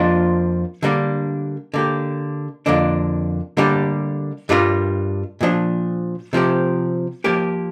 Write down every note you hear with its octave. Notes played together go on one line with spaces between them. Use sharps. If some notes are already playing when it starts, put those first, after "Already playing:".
Already playing: F2 F3 A#3 D4 F4
D3 G3 A#3 D4
D3 A#3 G4
F2 D3 A#3 D4
D3 G3 A#3 D4 G4
G2 G3 D4 F4 A#4
A#2 F3 D4
C3 F3 C4 G4
F3 A#3 G4 A#4